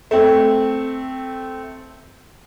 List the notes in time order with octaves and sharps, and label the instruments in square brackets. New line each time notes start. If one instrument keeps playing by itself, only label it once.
[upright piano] A3 C4